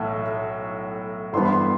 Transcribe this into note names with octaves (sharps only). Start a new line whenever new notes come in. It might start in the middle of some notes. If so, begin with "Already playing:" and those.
Already playing: B1 A2 E3 A3
G1 G2 E3 G3 B3 C6
B5
C6